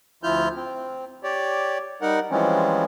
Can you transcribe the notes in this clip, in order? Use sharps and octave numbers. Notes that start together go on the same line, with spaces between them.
D2 F3 E4 F4 F6 G6
C4
G4 C#5 D5
G3 D#4 A#4 F#5
E3 F3 G3 G#3 C4 C#4